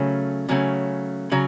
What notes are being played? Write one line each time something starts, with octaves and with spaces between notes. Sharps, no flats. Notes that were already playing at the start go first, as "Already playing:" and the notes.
Already playing: C#3 F#3 A3 C#4
C#3 F#3 A3 C#4
C#3 F#3